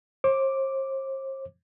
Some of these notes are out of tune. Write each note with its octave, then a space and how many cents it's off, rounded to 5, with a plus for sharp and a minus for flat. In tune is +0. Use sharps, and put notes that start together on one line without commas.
C5 +40 D6 +0